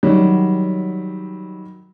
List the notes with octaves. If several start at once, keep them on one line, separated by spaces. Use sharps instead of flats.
D#3 F#3 G3